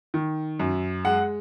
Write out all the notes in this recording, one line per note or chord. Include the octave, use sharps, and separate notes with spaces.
D#3
F#2
G#3 F#5